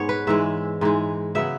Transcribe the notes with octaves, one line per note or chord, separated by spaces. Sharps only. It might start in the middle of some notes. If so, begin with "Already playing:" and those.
Already playing: G#2 G#3 B3 C#5
B4
G#2 E3 G#3 E5
G#2 E3 G#3
C#3 F#3 B3 E5